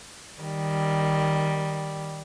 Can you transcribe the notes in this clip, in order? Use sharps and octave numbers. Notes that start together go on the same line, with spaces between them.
D#3 G3